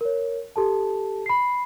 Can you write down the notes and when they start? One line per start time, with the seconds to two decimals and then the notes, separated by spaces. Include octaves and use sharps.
0.01 A#4 C#5
0.56 G4 A4 A5
1.26 B5 C7